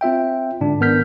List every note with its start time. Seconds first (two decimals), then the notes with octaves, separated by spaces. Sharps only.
0.01 C4 F4 E5 G5
0.61 G#2 D3 D4
0.81 G#1 B3 A#4 F6 G6 B6